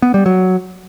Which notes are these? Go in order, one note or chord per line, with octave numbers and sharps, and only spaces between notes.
B3
G3
F#3